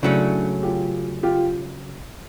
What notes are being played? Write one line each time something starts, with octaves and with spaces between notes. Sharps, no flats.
C#3 F#3 A3 C#4 D4 E4
F4 G4
F4 G4